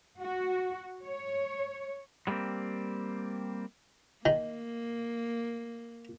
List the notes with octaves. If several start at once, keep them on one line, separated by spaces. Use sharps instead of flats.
F#4
C#5
F#3 G3 A3 A#3 C4
D#3 A#3